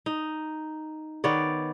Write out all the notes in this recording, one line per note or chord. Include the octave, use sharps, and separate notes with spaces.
D#4
D#3 B3 C#5 D5